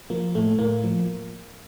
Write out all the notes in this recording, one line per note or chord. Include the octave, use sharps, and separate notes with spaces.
F3 A#3
A2 A3
A2 A#3
F3